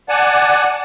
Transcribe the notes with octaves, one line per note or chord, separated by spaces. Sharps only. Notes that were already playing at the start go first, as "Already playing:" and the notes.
D5 F#5 G#5 A5